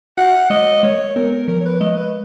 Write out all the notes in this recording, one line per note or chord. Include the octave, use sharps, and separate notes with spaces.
F#4 F#5
G#3 D#5
G#3 C#5
B3 A#4
A#4
F3 A#4
C#5
B4
G#3 D#5
B4